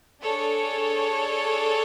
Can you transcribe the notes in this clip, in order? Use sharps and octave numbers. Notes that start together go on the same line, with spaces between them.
D4 G#4 A4 C#5